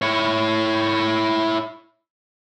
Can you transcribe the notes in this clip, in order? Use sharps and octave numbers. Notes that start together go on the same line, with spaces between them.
E4 C#5